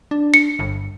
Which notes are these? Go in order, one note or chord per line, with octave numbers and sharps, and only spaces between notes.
D4
C#7
G1